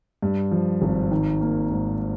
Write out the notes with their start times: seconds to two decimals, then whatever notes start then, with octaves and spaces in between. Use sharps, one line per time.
0.22 G2
0.51 F3
0.82 G#1
1.12 D#3
1.41 A#3
1.71 G#2